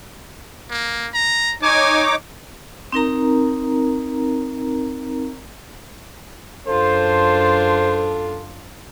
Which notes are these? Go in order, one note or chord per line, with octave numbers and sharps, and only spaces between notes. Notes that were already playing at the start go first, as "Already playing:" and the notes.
A#3
A#5
D#4 C#5 G#5 D6
C4 D#4 A#4 A#5
F#2 D4 F4 A4 C5